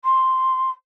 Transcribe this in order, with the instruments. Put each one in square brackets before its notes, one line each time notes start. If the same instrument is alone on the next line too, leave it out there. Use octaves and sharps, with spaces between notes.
[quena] C6